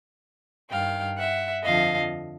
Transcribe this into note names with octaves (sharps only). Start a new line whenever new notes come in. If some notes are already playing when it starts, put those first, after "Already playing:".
G2 D#3 F5 G5
E5 F#5
F2 D3 F3 D#5 F5